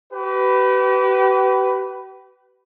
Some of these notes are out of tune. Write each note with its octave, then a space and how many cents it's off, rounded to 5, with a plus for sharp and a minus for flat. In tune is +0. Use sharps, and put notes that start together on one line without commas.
G4 -40 B4 +10